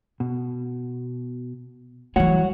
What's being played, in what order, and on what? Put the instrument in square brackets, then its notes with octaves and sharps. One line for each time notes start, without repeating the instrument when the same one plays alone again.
[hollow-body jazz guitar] B2
[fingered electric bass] E3 A3 [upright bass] F#3 G3 [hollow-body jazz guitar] F#4 [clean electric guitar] C#5 F#5